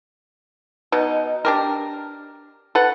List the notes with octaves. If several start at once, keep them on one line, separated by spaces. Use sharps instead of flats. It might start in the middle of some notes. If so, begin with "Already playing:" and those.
B2 D#4
D4 G4 A#4
A4 B4 F#5